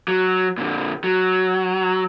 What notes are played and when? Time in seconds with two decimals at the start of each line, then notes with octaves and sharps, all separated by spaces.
0.08 F#3
0.58 A#2 D3
1.04 F#3